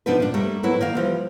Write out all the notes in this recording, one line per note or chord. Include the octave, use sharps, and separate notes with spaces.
C3 F3 B3 D4 D#4 B4
A#2 D4
G3 A3 A#3
A2 F#3 B3 E4
D#3 A#3 D5 F5
E3 F3 G3